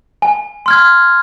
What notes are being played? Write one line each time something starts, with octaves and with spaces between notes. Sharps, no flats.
G#5
C6 F6 G#6